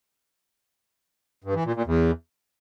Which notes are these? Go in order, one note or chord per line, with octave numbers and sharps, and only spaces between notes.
G2
E3
A#2
A#2
E2